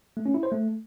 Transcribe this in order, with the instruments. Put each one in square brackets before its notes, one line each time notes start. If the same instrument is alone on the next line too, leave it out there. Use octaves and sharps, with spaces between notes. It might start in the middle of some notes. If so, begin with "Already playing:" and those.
[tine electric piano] A3
C#4
E4
C5
A3